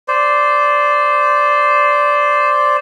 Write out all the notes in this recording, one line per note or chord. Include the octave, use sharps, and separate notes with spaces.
C5 D5